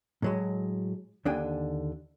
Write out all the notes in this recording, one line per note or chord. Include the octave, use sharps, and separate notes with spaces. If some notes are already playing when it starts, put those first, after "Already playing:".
A2 F#3 G#3
D#2 D3 D4 G5 G#5